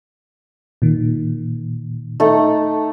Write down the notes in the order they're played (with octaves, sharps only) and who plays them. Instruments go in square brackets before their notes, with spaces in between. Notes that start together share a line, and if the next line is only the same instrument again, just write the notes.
[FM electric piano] A#2 D#3
[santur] A3 D#4 A4